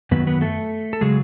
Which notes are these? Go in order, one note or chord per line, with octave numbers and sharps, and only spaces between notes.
F#2 D#3 F#3 B3 B4
B3 B4
A3 A4
A4
C#3 F#3 G#3 G#4